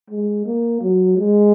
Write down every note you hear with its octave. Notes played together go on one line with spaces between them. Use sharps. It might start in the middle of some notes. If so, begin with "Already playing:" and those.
G#3
A#3
F#3
G#3